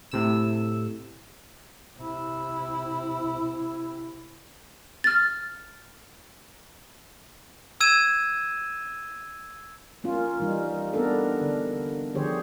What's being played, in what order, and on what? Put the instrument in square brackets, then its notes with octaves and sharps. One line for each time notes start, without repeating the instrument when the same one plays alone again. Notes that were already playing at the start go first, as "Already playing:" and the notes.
[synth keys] A2 C3 E6
[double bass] C3 E4
[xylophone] F6 A6
[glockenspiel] E6 G#6 D#7 E7
[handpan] A#3 C#4 F4
E3 G3 D#4
B3 C4 D4 A4 A#4
D3
D3 F3 G4 G#4 C5 C#5